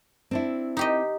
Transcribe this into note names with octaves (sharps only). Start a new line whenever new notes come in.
C4 D4 E4
D#4 G4 D#5